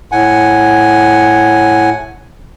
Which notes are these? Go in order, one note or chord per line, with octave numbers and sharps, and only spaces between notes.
A2 F#5 G#5